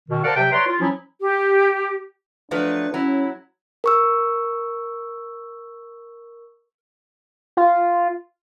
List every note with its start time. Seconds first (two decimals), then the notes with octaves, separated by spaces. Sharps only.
0.09 B2 D#3
0.24 A#4 C5 D5 F5 F#5 A5
0.36 C3 F#3 E5 G5
0.52 B4 C#5 D5 A#5 C6
0.66 F4
0.79 F3 F#3 C#4 E4
1.21 G4
2.51 F3 F#3 A3 D4 B4
2.94 F#3 C#4 E4
3.84 A#4 C#6 E6
7.57 F4